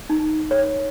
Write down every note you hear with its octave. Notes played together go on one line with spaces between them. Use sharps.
D#4
C#5